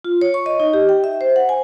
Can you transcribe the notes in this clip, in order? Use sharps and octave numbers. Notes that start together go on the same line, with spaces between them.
F4
C#5
C#6
D#5
D#4
G4
G5
E5
C5
F#5
G#5